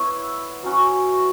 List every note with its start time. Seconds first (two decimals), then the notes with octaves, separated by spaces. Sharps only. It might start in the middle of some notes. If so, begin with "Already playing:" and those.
Already playing: B3 E4 C#5 E5
0.63 F#3 C#4 F#4